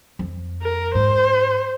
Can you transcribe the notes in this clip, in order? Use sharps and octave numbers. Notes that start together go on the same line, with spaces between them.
F2
A#4
G#2 C5